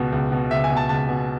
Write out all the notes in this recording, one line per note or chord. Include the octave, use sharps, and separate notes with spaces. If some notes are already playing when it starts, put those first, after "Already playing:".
Already playing: C#2 B2
C#2
B2
C#2 E5
G#5
B2
A5
C#2 A5
B2